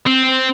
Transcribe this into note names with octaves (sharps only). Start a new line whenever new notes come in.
C4